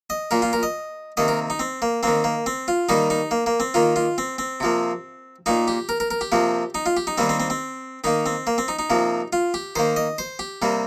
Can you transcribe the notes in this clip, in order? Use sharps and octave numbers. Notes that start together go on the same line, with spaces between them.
D#5
A#2 A#3 A#4
F4
A#4
D#5
C3 D#3 A#3 D#5
A#4
D#4
C4
A#3
D#3 A#3 C4
A#3
C4
F4
D#3 G3 A#3 D#4
D#4
A#3
A#3
C4
D#3 A#3 F4
F4
C4
C4
C3 F3 A#3
A#2 A#3 D#4
G4
A#4
A#4
A#4
G4
C3 F3 A#3
D#4
F4
G4
D#4
D#3 G3 A#3 C4
C4
C4
C4
D#3 A#3 D#4
C4
A#3
C4
D#4
D#4
C3 F3 A#3
F4
G4
D#3 A#3 C5
D#5
C5
G4
C3 G3 A#3